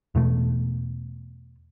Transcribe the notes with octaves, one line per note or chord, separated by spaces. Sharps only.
E2 B2 A3